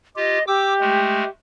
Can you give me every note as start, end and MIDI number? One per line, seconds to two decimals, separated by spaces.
0.16 0.38 65
0.16 0.38 67
0.16 0.46 75
0.47 1.28 67
0.47 0.74 86
0.47 0.74 88
0.81 1.24 56
0.81 1.24 57